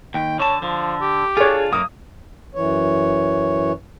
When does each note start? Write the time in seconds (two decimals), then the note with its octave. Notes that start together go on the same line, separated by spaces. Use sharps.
0.14 D#2 G5
0.40 D3 C#5 A5
0.62 D3 F3
1.01 G4
1.37 D4 F4 G#4 A4 C#5
1.73 F#2 A#3 D#6
2.55 F#2 E3 C#5